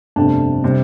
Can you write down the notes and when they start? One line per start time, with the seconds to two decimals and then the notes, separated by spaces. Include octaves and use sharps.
0.16 G1 F2 C3 A3 D4
0.64 C3 G3